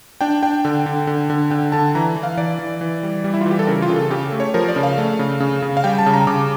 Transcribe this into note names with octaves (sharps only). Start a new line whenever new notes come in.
D4 G5
D4 G5
D3
D3
D3
D3
D3 G5
D3 A5
E3 A#5
E3
F5
E3 D5
E3
E3
G3
G3
E4
F4
E3
G4
A4
C#3 A#4
F4
C#3
A4
C#3 G4
A3
C#5
F3 A#4
D5
C#3
F5
A3
C#3
C#3
C#3
F5
G3 G5
A5
C#3
A#5
C#3 D6